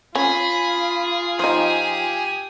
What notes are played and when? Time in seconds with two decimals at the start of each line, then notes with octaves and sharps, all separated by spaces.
0.15 C#4 F4 G#4 B5
1.39 F3 D#4 G4 G#5